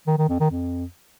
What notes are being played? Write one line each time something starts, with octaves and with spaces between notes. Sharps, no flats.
D#3
D#3
F2
D#3
F2